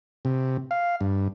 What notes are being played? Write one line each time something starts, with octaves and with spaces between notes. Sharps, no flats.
C3
F5
G2